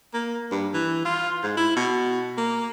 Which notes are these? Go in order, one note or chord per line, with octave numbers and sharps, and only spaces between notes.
A#3
G2
E3
F4
G#2
E4
B2
A#3